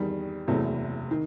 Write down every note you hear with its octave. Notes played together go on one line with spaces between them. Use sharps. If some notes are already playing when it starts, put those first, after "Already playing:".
Already playing: E2 D#3 G3
F#1 E2 C3 F#3 A3
D#3